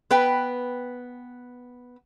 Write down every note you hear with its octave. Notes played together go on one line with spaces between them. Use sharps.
B3 B4 G5